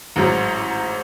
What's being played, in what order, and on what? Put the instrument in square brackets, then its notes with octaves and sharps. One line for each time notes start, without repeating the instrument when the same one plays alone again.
[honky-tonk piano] A1 G#2 F#3